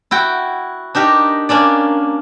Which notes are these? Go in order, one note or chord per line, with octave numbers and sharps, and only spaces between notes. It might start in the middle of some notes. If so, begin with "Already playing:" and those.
E4 F#4 G5
D4 D#4 G4 A#4
A#3 C#4 D4 D5